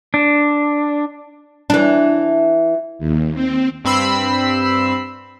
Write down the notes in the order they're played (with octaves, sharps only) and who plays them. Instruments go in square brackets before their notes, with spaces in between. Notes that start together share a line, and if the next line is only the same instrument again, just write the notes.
[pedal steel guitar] D4
[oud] E3 D4
[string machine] D#2
C4
[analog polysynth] G2 C4 B5 E6 C7